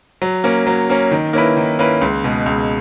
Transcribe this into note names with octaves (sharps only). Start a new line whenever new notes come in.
F#3
A#3 C#4
F#3
A#3 C#4
D#3
A#3 C#4 E4 B4
D#3
A#3 C#4 E4 B4
C#2
B2 G#3
C#2